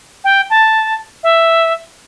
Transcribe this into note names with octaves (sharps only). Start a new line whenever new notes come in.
G5
A5
E5